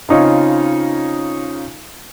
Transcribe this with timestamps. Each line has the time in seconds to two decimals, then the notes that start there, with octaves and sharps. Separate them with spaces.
0.09 C#3 C4 D#4 F4 C#5